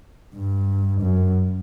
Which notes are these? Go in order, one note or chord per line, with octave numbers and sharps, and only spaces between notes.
G2
F#2